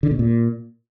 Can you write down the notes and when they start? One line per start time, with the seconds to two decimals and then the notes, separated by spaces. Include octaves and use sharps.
0.03 D3
0.11 B2
0.19 A#2